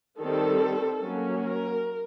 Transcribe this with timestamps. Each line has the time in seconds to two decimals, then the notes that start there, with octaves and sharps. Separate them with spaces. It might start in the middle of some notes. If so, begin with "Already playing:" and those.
0.19 D#3 G3 C4 A4
1.00 F#3 A#3 C#4
1.41 A#4